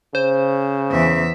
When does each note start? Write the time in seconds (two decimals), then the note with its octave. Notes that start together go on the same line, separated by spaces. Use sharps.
0.15 C#3 C5
0.90 E2 E5